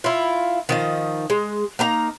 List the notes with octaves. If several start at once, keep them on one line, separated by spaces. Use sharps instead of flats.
E4 F4
D#3 F3 D#5
G#3
A#3 D#4 A#5